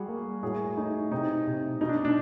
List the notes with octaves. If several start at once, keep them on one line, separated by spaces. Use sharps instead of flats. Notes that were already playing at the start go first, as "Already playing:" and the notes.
Already playing: G3 F#4 G#4
A#3
A2 F#4 G#4
A3 D#4
C3 D#4
C3
B2 D#4
D4
D4